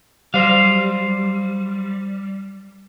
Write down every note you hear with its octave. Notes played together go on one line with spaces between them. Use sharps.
F#3 G3 C5 F5